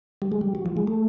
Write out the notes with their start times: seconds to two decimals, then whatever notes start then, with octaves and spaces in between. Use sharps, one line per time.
0.22 G3
0.32 G#3
0.41 G3
0.55 F#3
0.66 F3
0.77 G#3
0.87 A3